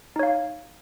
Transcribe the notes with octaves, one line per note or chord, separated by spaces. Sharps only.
D#4 C#5 F5